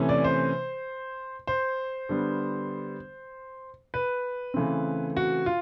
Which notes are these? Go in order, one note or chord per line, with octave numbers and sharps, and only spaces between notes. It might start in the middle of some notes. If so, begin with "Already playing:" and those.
Already playing: C3 E3 A3 C#4
D5
C5
C5
D3 G3 B3
B4
C#3 E3 A3 C4
F#4
F4